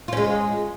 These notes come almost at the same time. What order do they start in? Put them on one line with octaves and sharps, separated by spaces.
F4 C#4 G#3